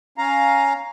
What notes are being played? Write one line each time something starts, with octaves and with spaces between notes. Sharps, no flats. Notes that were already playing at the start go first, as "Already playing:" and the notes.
C#4 F5 A#5